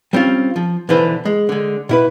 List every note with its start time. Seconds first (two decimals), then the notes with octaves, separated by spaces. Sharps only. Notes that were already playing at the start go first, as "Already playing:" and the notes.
0.13 G3 C4 C#4 F4
0.56 F3
0.89 B1 D3 E3 B4 C5
1.25 G#3
1.49 D3 G#3
1.89 B2 E4 B4